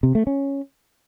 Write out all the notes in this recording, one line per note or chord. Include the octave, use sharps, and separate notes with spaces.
C3
A3
C#4